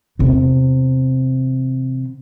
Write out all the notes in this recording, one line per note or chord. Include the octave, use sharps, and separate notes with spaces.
E2 C3